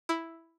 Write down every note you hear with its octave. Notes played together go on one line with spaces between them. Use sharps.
E4